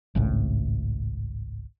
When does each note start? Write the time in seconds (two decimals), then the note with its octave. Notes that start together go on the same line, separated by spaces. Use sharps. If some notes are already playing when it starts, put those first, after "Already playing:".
0.15 G#1 C#2 A2